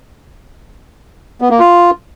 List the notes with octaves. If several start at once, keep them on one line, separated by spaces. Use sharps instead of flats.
B3
A#3
F4